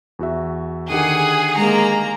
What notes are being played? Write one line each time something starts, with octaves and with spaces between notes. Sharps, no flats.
E2 F#4 E5
D3 D#3 G4 G#4 F#5 D#6
G#3 A#3 A#5